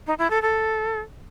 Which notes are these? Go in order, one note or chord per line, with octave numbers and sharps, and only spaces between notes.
D#4
E4
A4
A4